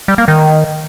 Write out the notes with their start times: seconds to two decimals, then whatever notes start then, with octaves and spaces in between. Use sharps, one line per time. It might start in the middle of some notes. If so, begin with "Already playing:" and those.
0.08 G3
0.18 A#3
0.28 D#3